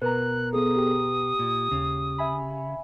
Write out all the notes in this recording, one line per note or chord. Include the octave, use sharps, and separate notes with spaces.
B2 A#4 B4 A#5 F#6
B3 G#4 A4 D#6
G4 G5
A#2
D#2 C#3
E5 G#5 B5